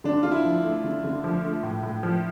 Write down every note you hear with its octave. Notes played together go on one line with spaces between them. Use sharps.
D3 D4
D3 F4
E4
F3
A3
D3
D3
F3
A3
A2
A2
F3